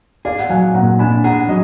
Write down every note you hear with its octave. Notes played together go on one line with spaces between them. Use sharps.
G#4 D5 F5
F#5
F#3 F5 G#5
A#2 F#5 A#5
D4 G#5 B5
G#4 F#5 A#5
F#3 D#5